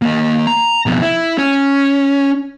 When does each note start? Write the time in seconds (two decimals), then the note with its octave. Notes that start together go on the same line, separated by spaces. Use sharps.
0.02 A#3 D#5
0.47 A#5
0.86 F2 B2
1.01 E4
1.38 C#4